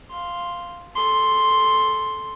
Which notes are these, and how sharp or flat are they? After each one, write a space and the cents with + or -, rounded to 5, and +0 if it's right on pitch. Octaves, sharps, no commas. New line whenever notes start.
F5 +0 C6 +0
A4 -10 C6 +0